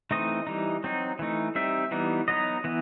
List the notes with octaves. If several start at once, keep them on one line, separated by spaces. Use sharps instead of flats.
E3 A3 C4 D#4 D#5
E3 G3 D#4
F#3 C4 D#4
E3 A3 D#4
G3 C4 D#4 E5
E3 G3 B3 D#4
F#3 B3 D#4 D#5
E3 B3